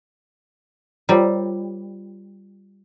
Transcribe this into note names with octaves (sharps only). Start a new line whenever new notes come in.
G3 F4 A#4 C5 C#5 G5 A#5